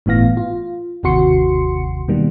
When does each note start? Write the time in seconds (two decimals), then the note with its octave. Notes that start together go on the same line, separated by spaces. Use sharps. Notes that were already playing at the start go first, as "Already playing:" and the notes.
0.06 G1 A2 E3 B3 F5 A#6
0.37 F4
1.03 G1 D#2 C3 F#4 C6 C#7
2.08 B2 D#3 G3 A#3